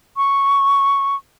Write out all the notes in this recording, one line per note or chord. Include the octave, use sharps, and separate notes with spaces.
C#6